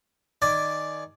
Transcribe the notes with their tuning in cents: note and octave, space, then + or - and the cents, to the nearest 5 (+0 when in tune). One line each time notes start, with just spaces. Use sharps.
D#3 +0 D5 +0 G#5 +20